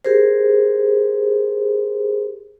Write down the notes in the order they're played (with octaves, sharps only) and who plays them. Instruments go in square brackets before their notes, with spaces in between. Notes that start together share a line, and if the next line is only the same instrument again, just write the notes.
[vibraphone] G4 G#4 A#4 C5